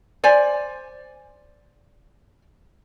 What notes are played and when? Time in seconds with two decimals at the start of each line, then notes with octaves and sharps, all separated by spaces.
0.24 C5 D5 G#5